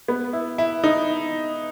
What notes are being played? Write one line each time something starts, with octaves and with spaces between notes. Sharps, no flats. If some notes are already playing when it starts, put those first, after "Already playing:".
B3
E4
E4
D#4